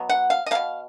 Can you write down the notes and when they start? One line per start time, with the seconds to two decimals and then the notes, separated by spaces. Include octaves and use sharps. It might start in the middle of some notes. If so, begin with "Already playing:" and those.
Already playing: B2 F#3 B3
0.09 F#5
0.30 F5
0.46 D#5
0.51 B2 A#3 F5